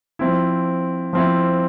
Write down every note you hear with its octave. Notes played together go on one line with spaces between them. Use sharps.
F3 C4 E4
F3 C4 E4